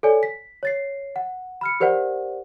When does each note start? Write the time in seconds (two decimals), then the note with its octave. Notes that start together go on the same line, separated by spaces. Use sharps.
0.03 A4 C#5 D5 G#5
0.23 B6
0.63 C#5 A6 C7
1.16 F#5
1.61 B5 F6 C#7
1.80 G4 A#4 C5 D5 F#5